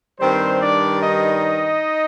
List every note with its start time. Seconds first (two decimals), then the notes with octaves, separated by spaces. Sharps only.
0.19 G2 D#3 G3 C4 C5
0.60 D4 D5
1.01 D#4 D#5